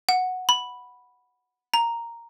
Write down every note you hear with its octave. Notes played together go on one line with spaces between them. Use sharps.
F#5
B5
A#5